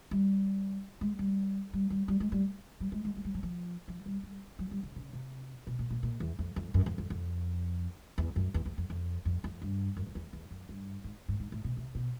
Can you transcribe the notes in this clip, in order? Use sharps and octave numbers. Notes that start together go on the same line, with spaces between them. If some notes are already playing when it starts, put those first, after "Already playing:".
G3
G#3
G3
G3
G3
G3
G#3
G3
G3
G#3
G#3
G#3
G3
F#3
F3
F3
G3
G3
F#3
G3
C#3
C#3
C3
B2
A#2
A#2
A#2
E2
F2
F2
F#2
F2
F2
F2
E2
F#2
E2
E2
F2
F2
F2
F2
G2
F#2
F2
E2
E2
F#2
G2
G#2
G#2
G#2
A2
B2
C3
B2